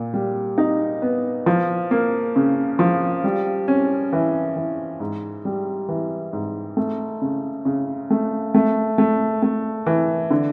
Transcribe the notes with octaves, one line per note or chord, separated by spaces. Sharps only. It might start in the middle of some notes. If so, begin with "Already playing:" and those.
Already playing: A#2
G3
D#4
B3
F3
A#3
C#3
F3
G3
C#4
E3
E3
G#2
G3
E3
G#2
A3
C#3
C#3
A3
A3
A3
A3
E3
D3